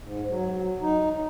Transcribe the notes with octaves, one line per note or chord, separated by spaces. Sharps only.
G#2
F#3
D#4